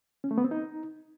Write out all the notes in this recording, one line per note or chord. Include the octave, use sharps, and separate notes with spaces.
C#4
A3
B3
C4
D#4